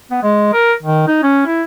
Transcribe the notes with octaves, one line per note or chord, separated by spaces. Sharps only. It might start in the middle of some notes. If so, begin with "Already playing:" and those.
B3
G#3
A#4
D#3
D#4
C#4
E4